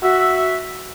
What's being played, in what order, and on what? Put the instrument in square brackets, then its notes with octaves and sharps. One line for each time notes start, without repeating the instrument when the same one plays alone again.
[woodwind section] F#4 E5